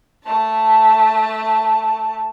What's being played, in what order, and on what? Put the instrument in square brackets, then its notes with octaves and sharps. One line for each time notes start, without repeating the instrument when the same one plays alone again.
[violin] A3 A5